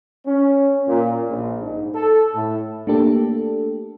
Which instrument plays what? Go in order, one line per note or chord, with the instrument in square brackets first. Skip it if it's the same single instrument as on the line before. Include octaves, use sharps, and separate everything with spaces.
[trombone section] C#4
A#2
A#1
G#2
A4
A2
[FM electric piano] A3 A#3 D4 G4 A4